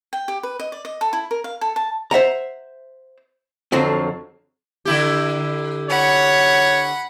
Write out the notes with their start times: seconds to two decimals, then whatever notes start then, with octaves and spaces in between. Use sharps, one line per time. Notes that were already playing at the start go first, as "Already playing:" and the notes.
0.13 G5
0.28 G4
0.43 B4
0.60 D#5
0.72 D5
0.85 D#5
1.01 A4
1.13 E4
1.31 A#4
1.44 F5
1.61 A4
1.76 A5
2.11 C5 E5 F#5 A#5
3.72 F2 D3 F3 F#3 C4
4.85 D3 E4 G4
5.90 C#5 F#5 B5